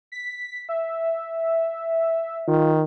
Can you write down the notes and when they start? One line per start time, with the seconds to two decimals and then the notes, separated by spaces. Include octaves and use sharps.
0.12 B6
0.69 E5
2.48 D#3 F4